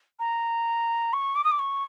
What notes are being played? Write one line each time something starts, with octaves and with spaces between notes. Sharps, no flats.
A#5
C#6
D6
D#6
D6
C#6